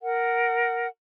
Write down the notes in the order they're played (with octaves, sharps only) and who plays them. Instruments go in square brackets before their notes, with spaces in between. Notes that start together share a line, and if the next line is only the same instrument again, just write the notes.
[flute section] A#4 F#5